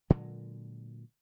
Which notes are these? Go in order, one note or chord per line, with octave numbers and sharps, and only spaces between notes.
A#2 D3 F#3 G#3